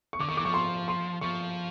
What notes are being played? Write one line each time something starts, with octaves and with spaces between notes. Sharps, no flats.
C#6
D3 D6
D#3 C#6
E3 D6
F3 C#6
C6
C6
F3 C#6